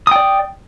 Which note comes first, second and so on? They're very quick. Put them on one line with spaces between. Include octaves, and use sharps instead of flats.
D#6 G5 D5